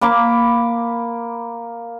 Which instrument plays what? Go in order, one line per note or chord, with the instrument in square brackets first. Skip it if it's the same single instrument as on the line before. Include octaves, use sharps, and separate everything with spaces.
[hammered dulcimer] A#3 B5 D6